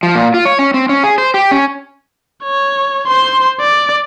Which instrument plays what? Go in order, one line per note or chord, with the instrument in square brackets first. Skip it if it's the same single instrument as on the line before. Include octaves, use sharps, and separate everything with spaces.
[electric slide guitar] F3
A#2
F4
C#5
C#4
C4
C#4
G#4
C5
G4
C#4
[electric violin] C#5
C5 C6
D5